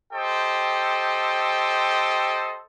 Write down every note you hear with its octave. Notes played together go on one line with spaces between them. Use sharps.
G4 A4 C5 D#5 G5